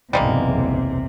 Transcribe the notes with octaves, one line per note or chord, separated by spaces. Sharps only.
F#1 B1 E2 C3 G3 G#3 A#3